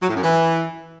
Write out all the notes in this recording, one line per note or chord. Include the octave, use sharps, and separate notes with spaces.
F#3
A2
F#2
E3